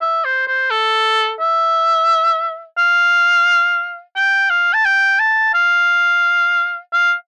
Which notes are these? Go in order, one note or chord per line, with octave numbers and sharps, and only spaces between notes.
E5
C5
C5
A4
E5
F5
G5
F5
A5
G5
A5
F5
F5